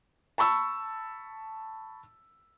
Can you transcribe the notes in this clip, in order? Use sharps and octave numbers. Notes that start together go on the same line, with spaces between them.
A5 B5 C#6 E6